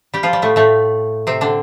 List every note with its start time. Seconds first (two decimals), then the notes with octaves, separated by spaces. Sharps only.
0.14 G3 G4
0.23 F3 F4
0.33 G3
0.42 A2 A3
0.56 A2 A3
1.27 C3 C4
1.41 D3 D4